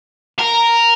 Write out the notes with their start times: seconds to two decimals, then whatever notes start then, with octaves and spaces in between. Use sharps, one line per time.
0.39 A#4